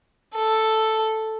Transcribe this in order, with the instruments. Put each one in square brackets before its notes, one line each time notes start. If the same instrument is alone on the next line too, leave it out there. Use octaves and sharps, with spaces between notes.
[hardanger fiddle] A4